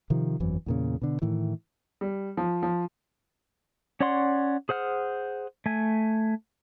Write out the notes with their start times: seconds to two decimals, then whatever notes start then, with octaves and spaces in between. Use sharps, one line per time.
0.10 C3 D#3 F3
0.40 G1 F2 E3 F#3
0.66 E2 A#2 C#3
1.02 B2 D3
1.22 A2 D#3 E3
2.01 G3
2.37 F3
2.63 F3
4.00 C#4 C#5 D5 F#5 C6
4.69 G#4 C5 F#5 F6
5.66 A3 G#5